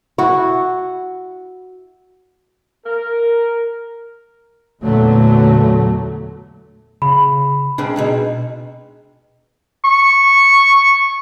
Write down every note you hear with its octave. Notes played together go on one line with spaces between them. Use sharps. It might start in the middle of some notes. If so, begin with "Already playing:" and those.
E4 F#4
A#4
E2 A#2 D3 F#3 A3
C#3 B5
C#3 G#3 C4 D4
B2 G#3 D#4
C#6